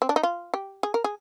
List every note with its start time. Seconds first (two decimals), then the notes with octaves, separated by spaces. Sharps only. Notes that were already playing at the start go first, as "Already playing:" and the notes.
0.02 C4
0.09 D4
0.16 D#4
0.23 F4
0.54 G4
0.83 G#4
0.94 A#4
1.04 G#4